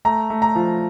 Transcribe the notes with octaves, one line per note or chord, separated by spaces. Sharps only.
A3 A#5
A3
A#5
F3